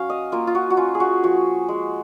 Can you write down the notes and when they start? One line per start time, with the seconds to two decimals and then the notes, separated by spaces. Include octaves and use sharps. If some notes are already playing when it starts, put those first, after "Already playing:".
Already playing: F#3 C#4 F5
0.10 D#5
0.32 A#3 F4
0.47 F4
0.55 F#4
0.70 F#4
0.77 C#4 F4
0.95 G#4
1.00 F#4
1.23 F3 F#4
1.69 G#3